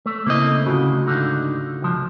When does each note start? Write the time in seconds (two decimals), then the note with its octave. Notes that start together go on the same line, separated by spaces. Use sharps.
0.06 A3
0.26 C#3 A3 A#3 C4 E4 D#5
0.66 D2 A2 C#3 F4 F#4
1.06 G#2 D3 D#4
1.82 C2 F3